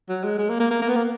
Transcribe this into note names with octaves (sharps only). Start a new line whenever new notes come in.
F#3
G#3
G#3
A#3
A#3
A#3
A#3
B3
A#3